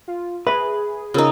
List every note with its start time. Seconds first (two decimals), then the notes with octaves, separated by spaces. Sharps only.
0.08 F4
0.47 G#4 B4 E5
1.14 C#3 D#4 F4 A#4